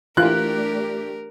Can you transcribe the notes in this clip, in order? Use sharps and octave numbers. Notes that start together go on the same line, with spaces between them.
E3 A3 D4 F4 G4 A#4 F#6